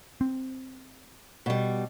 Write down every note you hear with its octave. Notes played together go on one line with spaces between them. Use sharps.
C4
B2 G3